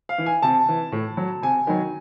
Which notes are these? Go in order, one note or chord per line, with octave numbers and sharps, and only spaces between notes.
F5
E3
G#5
C3 A5
E3
A2
F#3
C3 G#5
D#3 F#3